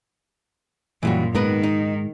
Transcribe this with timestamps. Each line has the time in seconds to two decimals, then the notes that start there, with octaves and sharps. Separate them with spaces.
1.03 F#2 A#2 E3 G3 F#4
1.35 G#2 D#3 B3 A#4 B4
1.63 D#4